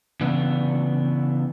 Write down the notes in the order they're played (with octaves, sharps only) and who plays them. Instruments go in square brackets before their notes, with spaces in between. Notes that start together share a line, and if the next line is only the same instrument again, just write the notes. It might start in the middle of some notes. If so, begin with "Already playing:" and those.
[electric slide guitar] C#3 E3 B3 D4